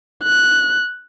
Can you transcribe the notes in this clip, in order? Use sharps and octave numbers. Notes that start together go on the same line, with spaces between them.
F#6